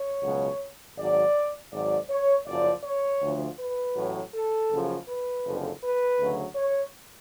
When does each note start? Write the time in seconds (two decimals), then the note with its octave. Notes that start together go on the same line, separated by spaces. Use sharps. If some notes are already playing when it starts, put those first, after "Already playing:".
Already playing: C#5
0.23 C#2 B2 F#3
0.97 G#1 G#2 F#3 D5
1.71 G#1 G#2 F#3 D5
2.09 C#5
2.45 F#1 F#2 F3 D5
2.83 C#5
3.21 D2 D3 F3
3.58 B4
3.95 A1 A2 F#3
4.33 A4
4.69 F#1 F#2 C#3 F3
5.07 B4
5.44 F#1 F2 D3
5.82 B4
6.18 D2 C#3 F#3
6.55 C#5